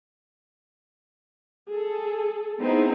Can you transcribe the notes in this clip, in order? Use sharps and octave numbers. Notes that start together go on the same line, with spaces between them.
G#4 A4
B3 C4 D#4 E4 G#4